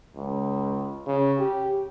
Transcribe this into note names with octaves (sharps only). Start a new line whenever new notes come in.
C#2
C#3
G4